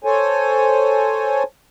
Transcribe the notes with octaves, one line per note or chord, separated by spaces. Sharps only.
A4 C5 C#5 G#5